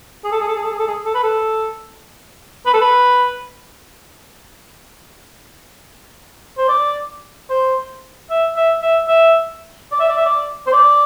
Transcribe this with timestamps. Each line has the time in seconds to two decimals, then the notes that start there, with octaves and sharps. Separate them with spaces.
0.24 G#4
0.32 A4
0.40 G#4
0.48 A4
0.56 G#4
0.64 A4
0.72 G#4
0.79 A4
0.87 G#4
1.05 A4
1.14 B4
1.23 A4
2.66 B4
2.74 A4
2.81 B4
6.58 C5
6.69 D5
7.50 C5
8.30 E5
8.57 E5
8.82 E5
9.08 E5
9.92 D5
10.00 E5
10.09 D5
10.17 E5
10.26 D5
10.67 C5
10.73 D5